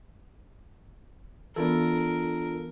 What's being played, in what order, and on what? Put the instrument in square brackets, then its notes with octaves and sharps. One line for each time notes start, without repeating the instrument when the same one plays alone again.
[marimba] E3 B3 [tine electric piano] D4 F4 A4 [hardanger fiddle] A#4